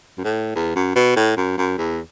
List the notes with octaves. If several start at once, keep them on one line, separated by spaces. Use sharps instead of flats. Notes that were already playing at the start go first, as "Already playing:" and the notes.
F#2
A2
E2
F#2
B2
A2
F#2
F#2
E2